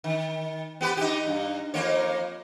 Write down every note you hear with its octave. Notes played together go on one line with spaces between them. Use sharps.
D#3
B3 G4 B4
D#4 G4
G2
F2 A#3 C#5